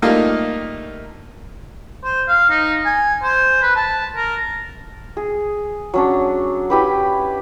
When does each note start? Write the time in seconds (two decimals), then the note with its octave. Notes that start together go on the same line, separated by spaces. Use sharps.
0.02 G3 A3 A#3 D#4 F4
2.04 C5
2.28 F5
2.50 D#4
2.85 G#5
3.23 C5
3.62 B4
3.76 A5
4.16 A#4
5.17 G#4
5.94 F#3 C#4 D4
6.70 E4 G4 B4